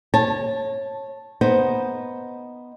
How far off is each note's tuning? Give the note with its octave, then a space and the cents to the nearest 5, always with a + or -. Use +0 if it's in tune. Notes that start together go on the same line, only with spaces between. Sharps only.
C#5 -20 A5 +0
B3 +0 D#4 +0 C5 +0